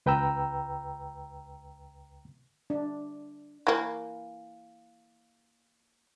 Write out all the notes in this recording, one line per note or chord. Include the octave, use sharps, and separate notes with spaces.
C#2 B4 G5 A#5 E6
D4
E3 A#3